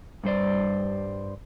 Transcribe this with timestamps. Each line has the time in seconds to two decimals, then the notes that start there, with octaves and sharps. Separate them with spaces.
0.23 G2 G3 C5 D5